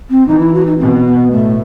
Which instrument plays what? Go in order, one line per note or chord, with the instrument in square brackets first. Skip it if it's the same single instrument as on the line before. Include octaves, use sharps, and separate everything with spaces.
[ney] C4
[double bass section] E3 [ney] D#4
[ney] E4
F#4
D#4
[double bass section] B2 [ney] C4
[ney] B3
[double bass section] A2 [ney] A3